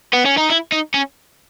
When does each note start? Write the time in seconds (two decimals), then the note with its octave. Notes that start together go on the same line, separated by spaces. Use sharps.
0.13 B3
0.25 C#4
0.37 D#4
0.50 E4
0.72 D#4
0.94 C#4